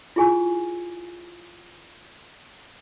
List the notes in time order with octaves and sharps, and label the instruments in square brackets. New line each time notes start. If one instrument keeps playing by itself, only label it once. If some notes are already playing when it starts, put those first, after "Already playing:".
[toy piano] E4 F4 G#4 G#5 C#6